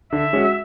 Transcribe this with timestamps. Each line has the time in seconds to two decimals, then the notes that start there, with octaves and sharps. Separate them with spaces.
0.12 D3 E5
0.33 G#3 C#4 F#4